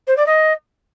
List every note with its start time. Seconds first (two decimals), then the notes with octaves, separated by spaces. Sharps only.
0.07 C5
0.17 D5
0.26 D#5